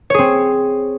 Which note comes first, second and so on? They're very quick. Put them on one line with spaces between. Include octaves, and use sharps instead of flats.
C#5 G#4 C4